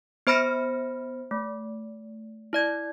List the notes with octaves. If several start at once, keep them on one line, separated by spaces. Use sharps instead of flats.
B3 C5 B5 F6 A#6 C#7
A3
E4 D5 G#6